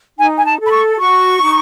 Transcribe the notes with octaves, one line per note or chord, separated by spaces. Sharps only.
D#4 G#5
G#5
A5
A4
B5
C#6
F#4 C#6
D#4